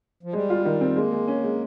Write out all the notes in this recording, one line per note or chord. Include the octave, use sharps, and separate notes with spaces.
F3
G3 G#3
F4
D#3
C4
G#3 A#3
G#3
C#4
G#3